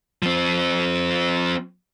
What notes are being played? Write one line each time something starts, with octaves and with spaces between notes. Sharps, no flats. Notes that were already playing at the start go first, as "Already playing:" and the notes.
F3 C4